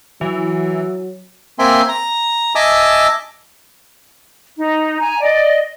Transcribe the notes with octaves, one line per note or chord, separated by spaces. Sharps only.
E3 F#3
A#3 C4 E5 G#5 C6
A#5
D#5 E5 G#5 A5 D6 E6
D#4
G#5 A#5
D5 D#5